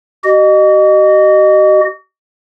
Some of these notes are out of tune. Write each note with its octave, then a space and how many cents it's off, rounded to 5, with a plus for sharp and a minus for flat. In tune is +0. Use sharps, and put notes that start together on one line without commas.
F#4 +45 D#5 -25